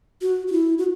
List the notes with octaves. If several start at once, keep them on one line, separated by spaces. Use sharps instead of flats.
F#4
F#4
E4
F#4